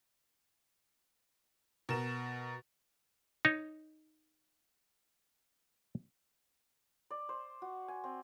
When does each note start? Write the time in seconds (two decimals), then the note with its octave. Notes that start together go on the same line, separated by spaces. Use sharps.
1.89 B2 A#4 E7
3.45 D#4 C#5
7.11 D5
7.29 C5
7.62 F#4
7.88 G#5
8.04 C4